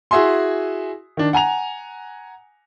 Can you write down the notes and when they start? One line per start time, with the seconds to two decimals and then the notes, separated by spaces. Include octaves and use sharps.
0.11 E4 F#4 G#4 E5 G#5 C6
1.17 D#3 D4
1.33 F#5 G#5 A#5 F7